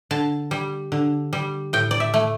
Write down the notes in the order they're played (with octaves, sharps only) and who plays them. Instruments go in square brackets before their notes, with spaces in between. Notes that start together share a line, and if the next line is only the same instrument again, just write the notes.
[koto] D3 A5
G3
D3
G3
A2 G5
D5
E5
A3